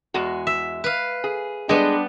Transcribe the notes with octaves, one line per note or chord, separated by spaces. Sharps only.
E2 G#3 F#4
E5
B4 F5
G#4
G3 G#3 B3 D4